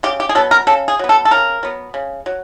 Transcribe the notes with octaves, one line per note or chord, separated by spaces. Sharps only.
C#3 G4
G4
G#4
F#3 B3 A4
A#4
C#3 A4
G#4
F#3 B3
A4
A4
C#3 A#4
F#3 B3
C#3
F#3